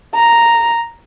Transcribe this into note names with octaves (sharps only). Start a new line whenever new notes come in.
A#5